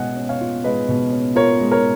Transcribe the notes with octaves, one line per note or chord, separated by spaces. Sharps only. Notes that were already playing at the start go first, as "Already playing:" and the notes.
Already playing: B2 G#3 C#4 D#5 F#5 G#5
C#4
C#5 F5
F4
G#3 B4 D#5
B2
C#4
F4 A#4 C#5
G#3
A#4 C#5